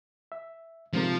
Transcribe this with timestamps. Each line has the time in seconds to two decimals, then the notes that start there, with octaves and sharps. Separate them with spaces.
0.32 E5
0.93 G#2 C3 F3 A#3